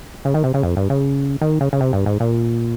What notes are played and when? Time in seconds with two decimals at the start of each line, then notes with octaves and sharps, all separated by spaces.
0.25 C#3
0.34 D#3
0.44 C3
0.54 C#3
0.63 F2
0.77 G2
0.90 C#3
1.41 D#3
1.61 C#3
1.73 C#3
1.81 C3
1.93 G2
2.06 G#2
2.20 A#2